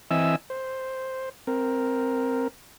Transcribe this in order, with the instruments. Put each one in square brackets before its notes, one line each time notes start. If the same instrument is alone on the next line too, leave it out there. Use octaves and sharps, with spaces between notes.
[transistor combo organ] E3 C4 D#5 E5 G#5 E6
C5
C4 A#4